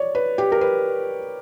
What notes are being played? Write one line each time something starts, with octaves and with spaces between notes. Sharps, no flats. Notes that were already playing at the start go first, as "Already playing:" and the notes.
Already playing: C#5 D5
B4
G4
A#4
B4